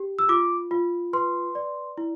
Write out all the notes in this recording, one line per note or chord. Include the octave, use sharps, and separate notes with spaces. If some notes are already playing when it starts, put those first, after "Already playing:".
Already playing: G4
E6
F4 D6
F4
B4 C6
D5
E4